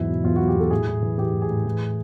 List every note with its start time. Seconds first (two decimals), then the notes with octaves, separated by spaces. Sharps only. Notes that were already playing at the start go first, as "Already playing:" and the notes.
Already playing: E2 G#2 F#3 E4
0.09 B2
0.24 E2 F4
0.36 F#3 F#4
0.48 G4
0.55 E2 A4
0.71 A2 G#4
0.87 A2
1.02 E3
1.18 E3 G4
1.33 A2
1.42 G#4
1.50 A2
1.65 E3